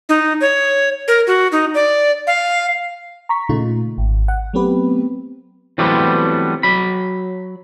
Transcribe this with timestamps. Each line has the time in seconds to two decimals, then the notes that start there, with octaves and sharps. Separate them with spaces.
0.09 D#4
0.41 C#5
1.08 A#4
1.27 F#4
1.52 D#4
1.75 D5
2.27 F5
3.29 A#5 C#6 B6
3.49 A#2 C#3 A3 D#4 F4
3.98 G#1
4.28 F#5
4.54 F#3 A3 B3 C4 G4 B4
5.78 E3 F#3 G3 A3 B3 C4
6.63 F#3 B5